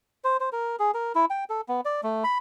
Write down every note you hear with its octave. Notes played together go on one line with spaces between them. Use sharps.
C5
C5
A#4
G#4
A#4
E4
G5
A4
B3
D5
A3
B5